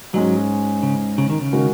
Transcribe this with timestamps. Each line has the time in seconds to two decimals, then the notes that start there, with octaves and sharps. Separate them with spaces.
0.13 G#2 F#3 G#3 C#4
0.83 C#3
1.18 C#3
1.29 D#3
1.41 C#3
1.52 D#3 G#3 F#4 A#4